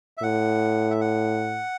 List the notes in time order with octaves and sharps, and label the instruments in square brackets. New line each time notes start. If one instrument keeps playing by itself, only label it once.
[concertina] E5
[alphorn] A2 [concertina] F#5
[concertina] E5
F#5